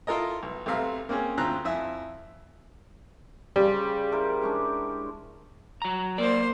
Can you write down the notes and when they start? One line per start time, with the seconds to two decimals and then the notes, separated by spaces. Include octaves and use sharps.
0.07 E4 F4 A4 A#4 D#5
0.43 B1
0.66 B1 C3 A3 E5 F5 A#5
1.09 A#3 C4 C#4 G#4
1.37 D2 C4 F4 A#5 F#6
1.65 F2 E4 E5 G#5
3.56 C#3 G3 C5
4.12 E4 A#4 C5
4.42 G#3 C#4 D4
5.82 F#3 A#5
6.18 F#2 A#3 C5 D5